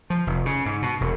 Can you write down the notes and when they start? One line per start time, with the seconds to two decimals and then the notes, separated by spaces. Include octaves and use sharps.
0.10 F3
0.27 F1
0.46 C#3
0.66 G#2
0.82 B2
1.01 E1